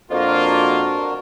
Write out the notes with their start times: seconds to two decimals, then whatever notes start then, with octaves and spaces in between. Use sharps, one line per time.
0.11 F2 A#3 D4 F4 F#4 A#4